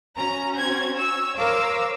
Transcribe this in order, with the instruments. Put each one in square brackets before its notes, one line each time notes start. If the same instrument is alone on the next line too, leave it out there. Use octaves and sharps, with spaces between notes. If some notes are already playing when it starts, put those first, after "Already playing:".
[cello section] C#4 F#4 [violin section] A#5
[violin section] C4 G#6
C#5 E6
[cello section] A#4 C5 C#5 [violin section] F5 D6 E6